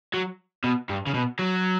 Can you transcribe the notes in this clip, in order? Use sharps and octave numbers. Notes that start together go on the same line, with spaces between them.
F#3
B2
G2
C#3
B2
F#3